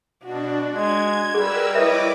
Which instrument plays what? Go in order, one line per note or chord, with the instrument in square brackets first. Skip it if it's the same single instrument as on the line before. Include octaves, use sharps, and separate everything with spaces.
[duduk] B2 [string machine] D4 [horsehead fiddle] F#4
[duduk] G#3 [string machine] G#6
[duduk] G3 [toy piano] G#4 [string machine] A#4 B4 E6
[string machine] E4 D6 [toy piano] B4 E5 [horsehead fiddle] C#5 D#5